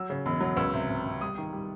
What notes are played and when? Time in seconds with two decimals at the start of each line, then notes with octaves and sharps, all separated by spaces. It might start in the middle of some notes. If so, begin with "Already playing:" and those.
Already playing: F#3 E6
0.10 C#3
0.26 E1
0.40 F#3
0.57 C#2 E6
0.74 C3
0.89 C3
1.05 C3
1.21 G3 D#6
1.38 D#3
1.53 G3